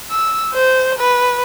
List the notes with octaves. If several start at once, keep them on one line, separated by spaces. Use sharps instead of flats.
E6
C5
B4